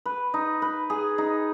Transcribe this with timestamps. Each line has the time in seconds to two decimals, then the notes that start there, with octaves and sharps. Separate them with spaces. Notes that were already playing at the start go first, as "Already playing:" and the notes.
0.06 B4
0.34 D#4
0.62 B4
0.90 G#4
1.18 D#4